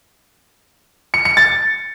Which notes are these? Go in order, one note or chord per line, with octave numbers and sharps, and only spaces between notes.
C#7
C#7
A6